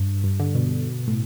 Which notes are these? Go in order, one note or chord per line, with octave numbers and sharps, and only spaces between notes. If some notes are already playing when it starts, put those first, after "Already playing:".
Already playing: G2
G2
D3
B2
A2